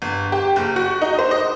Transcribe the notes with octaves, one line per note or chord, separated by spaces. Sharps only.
G1
G4
F#1
F#4
D#4
C5
D#5